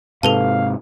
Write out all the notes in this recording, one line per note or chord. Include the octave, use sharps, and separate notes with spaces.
G#2 C3 A4 B4 F5 A5